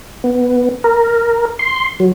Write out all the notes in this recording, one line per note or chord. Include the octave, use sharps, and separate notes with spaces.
B3
A#4
C6
F#3